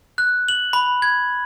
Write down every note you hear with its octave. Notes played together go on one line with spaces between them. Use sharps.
F#6
F#7
B5
G#6